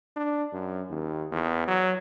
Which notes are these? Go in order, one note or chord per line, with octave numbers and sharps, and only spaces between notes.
D4
F#2
D#2
E2
F#3